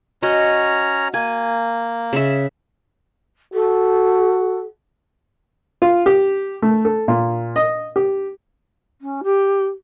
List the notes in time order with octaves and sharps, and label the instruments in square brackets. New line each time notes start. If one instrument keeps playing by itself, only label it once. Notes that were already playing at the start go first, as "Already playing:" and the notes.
[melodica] C#4 C#5 A#5 [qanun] F#4 D#5
[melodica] A#3 [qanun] G#5
[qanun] C#3 E5
[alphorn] F#4 [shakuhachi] A4
[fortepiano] F4
G4
A3
A4
A#2
D#5
G4
[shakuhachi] C#4
G4